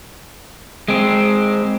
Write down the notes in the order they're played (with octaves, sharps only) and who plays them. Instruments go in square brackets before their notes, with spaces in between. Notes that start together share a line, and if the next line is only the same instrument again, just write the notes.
[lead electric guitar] G#3 C4